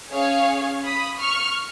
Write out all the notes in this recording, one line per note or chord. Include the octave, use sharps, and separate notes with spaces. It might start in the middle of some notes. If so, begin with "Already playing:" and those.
C#4 G#4 C#5 F5
B5 D#6
C#6 F6